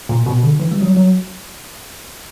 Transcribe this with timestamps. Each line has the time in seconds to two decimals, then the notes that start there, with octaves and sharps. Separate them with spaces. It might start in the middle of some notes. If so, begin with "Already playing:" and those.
0.09 A#2
0.26 B2
0.43 D3
0.60 E3
0.72 G3
0.81 F#3
0.95 F#3